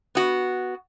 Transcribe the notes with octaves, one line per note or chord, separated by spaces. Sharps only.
B3 F#4